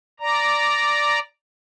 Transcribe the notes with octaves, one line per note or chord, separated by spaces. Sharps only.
D5 A#5